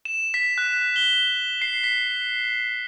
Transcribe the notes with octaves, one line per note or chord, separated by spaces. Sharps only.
E7
B6
F#6
G7
C7
B6